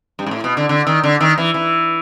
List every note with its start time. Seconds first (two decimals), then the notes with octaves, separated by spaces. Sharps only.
0.19 G2
0.26 G#2
0.31 A2
0.44 B2
0.57 D3
0.69 D3
0.87 D#3
1.04 D3
1.21 D#3
1.38 E3
1.54 E3